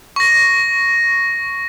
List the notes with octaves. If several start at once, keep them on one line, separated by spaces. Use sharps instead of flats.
C#6 A#6